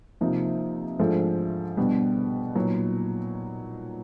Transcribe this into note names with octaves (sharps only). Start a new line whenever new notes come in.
C3 F3 A#3 D#4
G#2 F3 A3 D4
B2 G3 B3 D4
A#2 F#3 B3 D#4